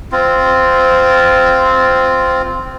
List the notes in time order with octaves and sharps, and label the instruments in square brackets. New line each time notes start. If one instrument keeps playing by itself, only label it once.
[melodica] C4 F4